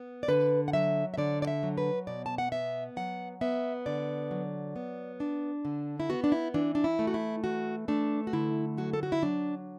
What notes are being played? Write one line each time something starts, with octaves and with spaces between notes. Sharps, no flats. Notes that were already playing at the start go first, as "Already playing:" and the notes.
Already playing: B3
D5
D3 B4
F#5
F#3 E5
E5
D3 D5
D5
E5
F#3
B4
B2 D5
A5
F#5
B3 E5
F#3 F#5
B3 E5
D3 D5
F#3
B3
D4
D3
E4
B3 F#4
D4
E4
E3 D4
D4
E4
A3
F#4
E4
E3 F#4
A3 D4
F#4
D3 E4
F#3 F#4
A4
F#4
E4
F#3 D4